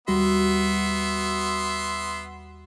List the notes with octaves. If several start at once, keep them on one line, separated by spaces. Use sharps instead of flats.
D#2 G3 B3 F#4 E5 C6